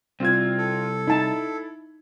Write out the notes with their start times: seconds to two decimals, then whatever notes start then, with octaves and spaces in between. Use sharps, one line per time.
0.20 C2 C4 F4 G#6
0.58 A4
1.07 D#4 E4 A5